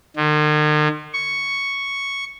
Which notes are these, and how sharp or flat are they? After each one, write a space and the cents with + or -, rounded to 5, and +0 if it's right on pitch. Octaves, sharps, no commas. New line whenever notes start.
D#3 -45
C#6 +0